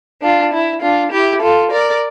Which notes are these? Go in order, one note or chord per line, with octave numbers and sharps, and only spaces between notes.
D4 F4
E4
D4 F4
E4 G4
F4 A4
A#4 D5